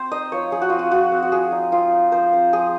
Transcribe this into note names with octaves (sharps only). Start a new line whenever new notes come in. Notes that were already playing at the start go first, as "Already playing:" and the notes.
Already playing: C4 C5
D#4 D#5
F3 C#5
F3 G#4
F#4
C4 F4
F#4
F3 F#4
C4
F#4
F3 G#4
D#4
C4 F4
D#4
F3 C5
C4
F3 G#4